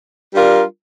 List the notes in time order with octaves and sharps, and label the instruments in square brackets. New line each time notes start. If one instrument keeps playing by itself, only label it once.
[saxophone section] G3 D4 F4 A#4